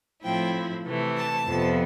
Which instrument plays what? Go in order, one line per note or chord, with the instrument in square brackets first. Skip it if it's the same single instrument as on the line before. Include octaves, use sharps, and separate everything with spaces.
[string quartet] A2 F3 C4 E4 G5
C3 E3 A3
A5
F2 C3 F3 B3